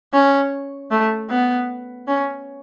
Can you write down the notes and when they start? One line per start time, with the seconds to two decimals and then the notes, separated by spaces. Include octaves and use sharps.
0.13 C#4
0.91 A3
1.30 B3
2.08 C#4